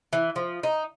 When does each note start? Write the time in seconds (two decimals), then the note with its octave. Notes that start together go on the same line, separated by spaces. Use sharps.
0.13 E3
0.36 F3
0.63 D#4